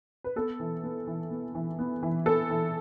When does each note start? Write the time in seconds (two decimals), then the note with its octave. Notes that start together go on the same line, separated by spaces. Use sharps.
0.24 B4
0.36 B3 A4
0.60 E3
0.83 B3
1.07 E3
1.31 B3
1.55 E3
1.79 B3
2.03 E3
2.26 B3 A4
2.50 E3